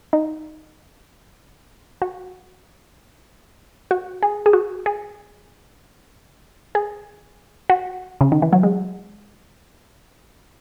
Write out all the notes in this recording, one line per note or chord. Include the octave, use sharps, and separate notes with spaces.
D#4
F#4
F#4
G#4
G#4
F#4
G#4
G#4
F#4
C#3
D#3
E3
F#3
G#3